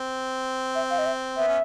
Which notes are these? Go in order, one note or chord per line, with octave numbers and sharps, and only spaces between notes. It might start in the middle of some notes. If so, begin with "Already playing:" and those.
Already playing: C4
E5
F5
D#5
E5
B3 E5
C#4